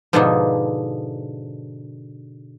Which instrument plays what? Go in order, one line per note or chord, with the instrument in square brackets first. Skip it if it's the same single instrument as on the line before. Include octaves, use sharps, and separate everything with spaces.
[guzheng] G#2 B2 D3 F3 D4 D#4